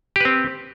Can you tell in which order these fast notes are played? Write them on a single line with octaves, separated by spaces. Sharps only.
G4 B4 C4